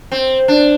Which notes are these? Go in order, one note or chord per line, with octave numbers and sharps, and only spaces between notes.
C4
D4